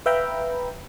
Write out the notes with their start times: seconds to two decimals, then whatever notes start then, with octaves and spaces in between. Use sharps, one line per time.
0.06 B4 E5 F5 G5 A#5 B5